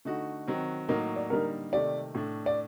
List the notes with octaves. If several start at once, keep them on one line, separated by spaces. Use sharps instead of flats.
D3 A3 D#4 F#4
D#3 F#3 C4 F#4
A2 F#3 A#3 D#4 A#4
D5
D3 G3 A#3 D#4 A#4
C3 D#3 A3 D5
A2 A3 D4
D5